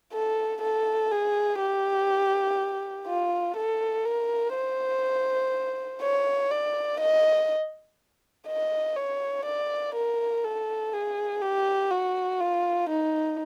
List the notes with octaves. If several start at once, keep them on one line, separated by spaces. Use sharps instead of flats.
A4
A4
G#4
G4
F4
A4
A#4
C5
C#5
D5
D#5
D#5
C#5
D5
A#4
A4
G#4
G4
F#4
F4
D#4